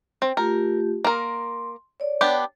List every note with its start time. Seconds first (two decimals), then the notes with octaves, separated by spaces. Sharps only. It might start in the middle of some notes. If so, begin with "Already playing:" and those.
0.22 C4
0.37 A3 F4 G4 A#4
1.04 A#3 A#4 C6
2.00 C#5 D5
2.21 B3 D4 G4